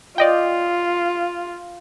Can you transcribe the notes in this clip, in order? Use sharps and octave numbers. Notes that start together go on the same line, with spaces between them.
F4 D5 D#5 G5